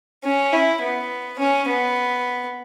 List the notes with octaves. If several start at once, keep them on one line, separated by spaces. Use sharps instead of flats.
C#4
E4
B3
C#4
B3